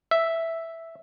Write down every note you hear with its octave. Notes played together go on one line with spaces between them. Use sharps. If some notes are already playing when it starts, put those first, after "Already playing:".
E5